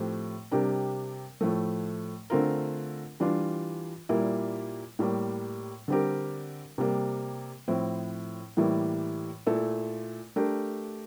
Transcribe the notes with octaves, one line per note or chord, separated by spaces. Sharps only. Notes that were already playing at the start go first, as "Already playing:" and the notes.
Already playing: A2 F3 A3 C4 G4
C3 G3 D4 G4 A#4
A2 F3 A3
D3 A3 C4 F4 A#4
E3 G3 D4 F4
A#2 G3 A#3 E4
A2 G3 A#3
D3 G3 C4 G4 A#4
C3 G3 A#3
A2 F3 C4 E4
A2 E3 G3 A#3 E4
A#2 A3 E4 A4
A3 D4 G4 A#4